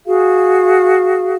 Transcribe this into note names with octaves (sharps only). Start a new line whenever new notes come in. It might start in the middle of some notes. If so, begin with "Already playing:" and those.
F#4 G#4 F5